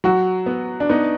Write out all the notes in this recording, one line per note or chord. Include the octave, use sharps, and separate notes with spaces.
F#3 F#4
B3
D4
B3 D#4